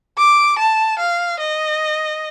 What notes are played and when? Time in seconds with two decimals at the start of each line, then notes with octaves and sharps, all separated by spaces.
0.18 D6
0.59 A5
0.99 F5
1.39 D#5